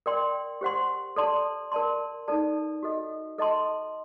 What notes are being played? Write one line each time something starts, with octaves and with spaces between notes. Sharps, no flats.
A#4 D5 G5 C6
G4 C5 F#5 C6
A4 D5 A5 C6
A#4 D5 A5 C6
D#4 A4 D5 A5
F#4 A4 D#5
A4 D#5 A5 C6